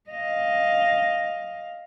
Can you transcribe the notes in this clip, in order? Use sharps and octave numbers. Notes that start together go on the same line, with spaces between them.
D#5 F5